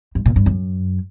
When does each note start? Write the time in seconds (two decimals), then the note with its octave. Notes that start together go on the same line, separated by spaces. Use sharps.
0.15 G2
0.26 A#2
0.36 G2
0.46 F#2